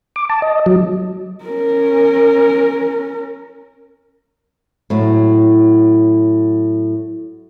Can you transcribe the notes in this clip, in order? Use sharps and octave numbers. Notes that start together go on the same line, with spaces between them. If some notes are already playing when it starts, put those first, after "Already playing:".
D6
A5
D#5
F#3
C#4 A#4
A2 F#3